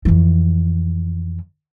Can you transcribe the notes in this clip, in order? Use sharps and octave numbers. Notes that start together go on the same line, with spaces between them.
F2 E3